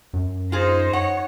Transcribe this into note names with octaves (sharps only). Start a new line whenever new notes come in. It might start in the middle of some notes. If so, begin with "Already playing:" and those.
F#2
D#4 F4 G#4 C5
C#5 F#5